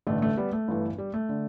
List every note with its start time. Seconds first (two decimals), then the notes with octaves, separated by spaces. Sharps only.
0.07 A1 G2 D3 A3
0.22 A3
0.37 G3 B3
0.53 A3
0.68 G1 G2 E3
0.98 G3
1.14 A3
1.29 D3